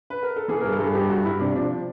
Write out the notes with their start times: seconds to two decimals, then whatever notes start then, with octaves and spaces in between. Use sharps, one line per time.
0.10 B4
0.23 A#4
0.36 A4
0.48 E3 G#4
0.60 G2 A#4
0.72 A4
0.80 G2 G#4
0.95 G2 G4
1.09 G2 F#4
1.24 G2 E4
1.40 C3 D4
1.56 F3 D4